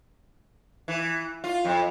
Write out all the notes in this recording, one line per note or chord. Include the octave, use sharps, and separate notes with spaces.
E3
F4
F2